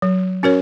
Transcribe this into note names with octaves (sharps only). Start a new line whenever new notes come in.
F#3
C#4 F#4 A#4 C#5